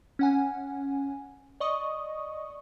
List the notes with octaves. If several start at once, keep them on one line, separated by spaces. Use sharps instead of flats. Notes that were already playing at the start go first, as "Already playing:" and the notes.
C#4 F#5 G#5
D5 D#5 C#6 D#6